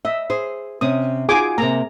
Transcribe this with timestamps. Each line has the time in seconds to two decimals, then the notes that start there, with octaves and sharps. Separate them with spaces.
0.05 D#5 E5
0.30 G#4 C5
0.81 C3 C#4 D#6
1.29 D#4 F4 F#4 G#4 G#5 D6
1.58 C3 A#3 A#4 A#5